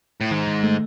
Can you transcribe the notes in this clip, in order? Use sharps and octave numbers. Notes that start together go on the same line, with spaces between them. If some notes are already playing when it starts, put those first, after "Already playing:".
A2
G#2 D#3
D#3
A3